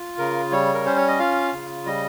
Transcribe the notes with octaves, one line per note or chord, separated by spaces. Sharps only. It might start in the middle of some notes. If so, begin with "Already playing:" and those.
Already playing: F4
C#3 A#4
G3 C#5
A#4
C#4 C5
C#5
D#5
F4 F5
C#3
G3 D#5